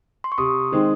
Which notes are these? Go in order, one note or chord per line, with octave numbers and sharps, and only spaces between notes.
C6
C#6
C3 C6 D#6
D#3 G#3 C4 D#4